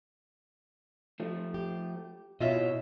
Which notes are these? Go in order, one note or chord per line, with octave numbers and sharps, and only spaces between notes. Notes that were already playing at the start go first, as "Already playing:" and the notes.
F3 A3
G4
B2 E4 F4 C#5 D#5 E5